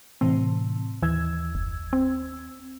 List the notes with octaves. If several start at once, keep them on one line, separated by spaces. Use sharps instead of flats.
A2 C3 E3 C4
D#2 E3 E6 G#6
F#1
C4